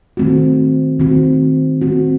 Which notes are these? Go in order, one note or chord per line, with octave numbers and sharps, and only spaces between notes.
D#3 A3 C4 F#4
D#3 A3 C4 F#4
D#3 A3 C4 F#4